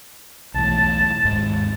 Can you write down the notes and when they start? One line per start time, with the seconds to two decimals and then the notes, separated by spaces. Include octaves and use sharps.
0.54 B1 E2 A2 A5
1.25 D#2 G#2 G#3